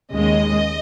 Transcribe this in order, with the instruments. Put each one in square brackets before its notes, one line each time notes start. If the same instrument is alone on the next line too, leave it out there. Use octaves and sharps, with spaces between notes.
[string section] D#2 C#3 G#3 D#5